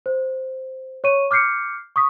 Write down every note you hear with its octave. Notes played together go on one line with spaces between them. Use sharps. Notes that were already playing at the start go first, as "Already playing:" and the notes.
C5
C#5 C#6 D#7
D6 F6 G6 C7 C#7
C#6 D#6 B6